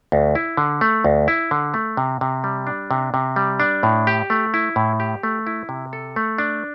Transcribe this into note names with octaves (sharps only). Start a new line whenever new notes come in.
D2
E4
D3
A3
D2
E4
D3
A3
C3
C3
G3
D4
C3
C3
G3
D4
A2
G4
A3
E4
A2
G4
A3
E4
C3
A4
A3
D4